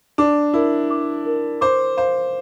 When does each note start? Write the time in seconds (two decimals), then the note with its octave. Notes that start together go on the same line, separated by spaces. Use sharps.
0.18 D4 D6
0.54 E4 A#4
0.91 D6
1.26 A#4
1.61 C5 D6
1.97 C5 F5